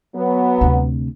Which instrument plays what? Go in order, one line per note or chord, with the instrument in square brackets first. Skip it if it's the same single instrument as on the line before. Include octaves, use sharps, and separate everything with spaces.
[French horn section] F#3 B3
[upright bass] D2 C3